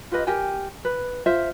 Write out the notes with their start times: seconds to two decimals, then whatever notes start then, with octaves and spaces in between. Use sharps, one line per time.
0.11 F4 G4 B4 D#5
0.27 G4 A#4 G5 G#5
0.85 B4
1.26 F4 C5 E5